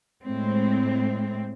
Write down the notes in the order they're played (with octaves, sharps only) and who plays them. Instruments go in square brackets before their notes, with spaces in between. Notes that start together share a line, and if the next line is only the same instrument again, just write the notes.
[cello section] A2 G#3 C4